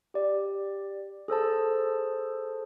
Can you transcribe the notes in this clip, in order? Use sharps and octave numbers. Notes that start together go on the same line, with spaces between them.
G4 D5
G#4 A4 C5 A5